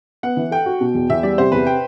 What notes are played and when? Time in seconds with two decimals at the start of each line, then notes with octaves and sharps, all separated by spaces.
0.23 B3 F#5
0.37 E3
0.51 A4 G5
0.66 F#4
0.81 B2
0.95 E2
1.10 E2 E5
1.23 G3 D5
1.38 C3 C5
1.52 E2 B4
1.67 G5